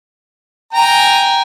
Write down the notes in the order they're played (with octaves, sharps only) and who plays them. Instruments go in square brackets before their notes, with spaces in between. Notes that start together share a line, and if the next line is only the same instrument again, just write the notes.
[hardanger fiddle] G5 G#5 [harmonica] A#5